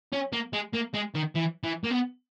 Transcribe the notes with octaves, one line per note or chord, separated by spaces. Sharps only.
C#4
A#3
G#3
A#3
G#3
D#3
E3
E3
A#3
B3